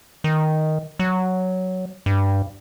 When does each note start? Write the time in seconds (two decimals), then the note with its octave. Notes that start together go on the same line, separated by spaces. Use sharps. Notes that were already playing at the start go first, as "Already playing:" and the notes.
0.24 D#3
0.99 F#3
2.06 G2